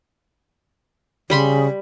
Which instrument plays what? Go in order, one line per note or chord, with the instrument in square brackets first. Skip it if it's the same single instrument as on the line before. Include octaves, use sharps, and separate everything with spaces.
[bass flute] C#3 [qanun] G3 B5 C6